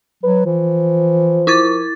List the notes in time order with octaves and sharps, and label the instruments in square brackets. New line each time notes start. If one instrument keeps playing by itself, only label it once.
[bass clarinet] F#3 [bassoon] B4
[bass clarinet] E3 [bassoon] F3
[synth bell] E4 D6 A6